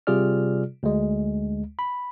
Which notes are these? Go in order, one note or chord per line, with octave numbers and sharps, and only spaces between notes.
C3 G3 F4 G#4 D5 F6
D2 G#3
B5